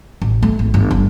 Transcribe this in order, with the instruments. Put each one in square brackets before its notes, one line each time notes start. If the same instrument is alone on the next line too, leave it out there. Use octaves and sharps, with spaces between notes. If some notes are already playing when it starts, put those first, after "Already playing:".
[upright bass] A1
A3
G#1
G1
G2